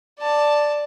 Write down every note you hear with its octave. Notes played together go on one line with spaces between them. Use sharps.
D5 A5